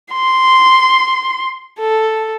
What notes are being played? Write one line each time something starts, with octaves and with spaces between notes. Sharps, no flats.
C6
A4